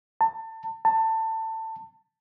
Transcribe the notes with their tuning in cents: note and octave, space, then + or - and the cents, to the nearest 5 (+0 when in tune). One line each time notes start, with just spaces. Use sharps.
A5 +25
A5 +20